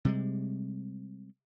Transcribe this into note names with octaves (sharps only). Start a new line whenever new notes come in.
C3 G3 G#3